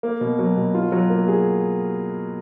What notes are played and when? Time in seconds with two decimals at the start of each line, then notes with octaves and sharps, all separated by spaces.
0.03 A#3
0.21 B2
0.39 F#3
0.57 B2
0.74 F4
0.92 F#3
1.10 A#3
1.28 G#4